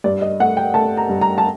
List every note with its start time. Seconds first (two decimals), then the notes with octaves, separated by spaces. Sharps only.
0.04 G2 D5
0.22 D#5
0.40 A3 F#5
0.57 G5
0.74 A3 A5
0.97 A#5
1.09 G2
1.21 A#5
1.38 A5